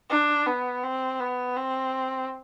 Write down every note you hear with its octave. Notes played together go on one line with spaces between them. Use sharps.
D4
B3
C4
B3
C4